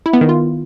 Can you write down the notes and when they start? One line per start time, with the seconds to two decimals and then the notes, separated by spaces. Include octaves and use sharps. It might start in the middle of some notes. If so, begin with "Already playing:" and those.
0.06 E4
0.13 B3
0.21 D#3
0.29 F4